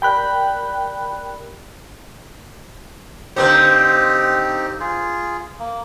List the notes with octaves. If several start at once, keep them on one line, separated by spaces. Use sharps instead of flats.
G4 A#4 D5 G5 B5 F#6
D3 A#3 C4 D#4 G4 C5
F4 G#4
A#3